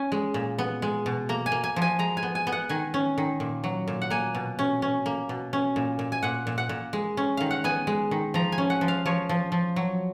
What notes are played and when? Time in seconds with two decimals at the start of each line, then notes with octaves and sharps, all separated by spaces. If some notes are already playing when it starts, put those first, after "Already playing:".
Already playing: C#4 G#5
0.12 G#3
0.34 A#2
0.58 B3
0.82 G#3
1.06 B2
1.29 A#3 A#5
1.46 G#5
1.52 A#3
1.64 G#5
1.76 F3
1.82 G#5
1.99 G#3 A#5
2.17 G#5
2.23 B3
2.35 G#5
2.47 B3
2.52 F#5
2.69 D#3 G#5
2.94 C#4
3.18 D#3
3.40 A#2
3.64 F#3
3.88 A#2
4.02 F#5
4.10 A#3 G#5
4.35 B2
4.59 C#4
4.82 C#4
5.06 A#3
5.29 B2
5.53 C#4
5.76 A#2
5.99 A#2
6.12 G#5
6.23 A#2 F#5
6.47 A#2
6.58 F#5
6.69 A#2
6.93 G#3
7.17 C#4
7.37 D#3 F5
7.51 F#5
7.64 B3 G#5
7.87 G#3
8.11 D#3
8.34 F3 A#5
8.52 G#5
8.58 C#4
8.70 F#5
8.81 F3
8.88 F5
9.06 F3 C#5
9.29 F3
9.52 F3
9.76 F#3